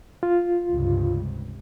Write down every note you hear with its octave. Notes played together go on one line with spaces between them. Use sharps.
F4
C#2 G2 C3